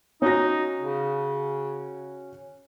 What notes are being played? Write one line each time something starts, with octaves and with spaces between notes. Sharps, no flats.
C#4 D#4 F#4 A#6
C#3